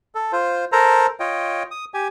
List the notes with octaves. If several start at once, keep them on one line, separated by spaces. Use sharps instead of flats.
A4
F4 C5
A4 A#4 C5 A#5
F4 C#5 D#5 G5
D#6
G4 G#5